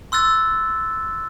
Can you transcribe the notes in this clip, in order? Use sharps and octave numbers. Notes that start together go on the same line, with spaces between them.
C6 E6 F#6 A6